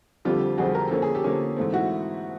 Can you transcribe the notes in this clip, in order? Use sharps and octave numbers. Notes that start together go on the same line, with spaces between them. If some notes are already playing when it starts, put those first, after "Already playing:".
F2 D3 G3 C4 F4 G4
F2 D3 G3 C4 F#4 G#4
A#4
D3 F3 A#3 C#4 A4
G#4
G4 A4
D3 F3 A#3 C#4
G#2 E3 A3 C4
E4 F#4